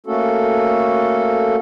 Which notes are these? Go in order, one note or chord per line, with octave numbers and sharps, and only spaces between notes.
A3 A#3 C#4 F#4 A4